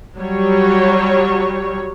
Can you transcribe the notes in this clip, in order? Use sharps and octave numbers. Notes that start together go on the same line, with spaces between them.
F#3 G3 C#5